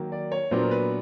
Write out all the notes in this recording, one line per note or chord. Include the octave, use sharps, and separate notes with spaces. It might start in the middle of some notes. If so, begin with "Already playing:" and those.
Already playing: D#3 F#3 A#3
D5
C#5
A#2 F#3 B3 D4 C5
A#4
B4